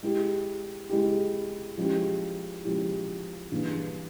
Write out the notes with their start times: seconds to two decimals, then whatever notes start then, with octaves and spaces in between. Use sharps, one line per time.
0.03 G#3 E4 G4
0.89 G#3 E4 G4
1.77 F3 G#3 C#4 E4 G4
2.64 F3 G#3 C#4 E4 G4
3.52 G2 E3 A#3 E4 G#4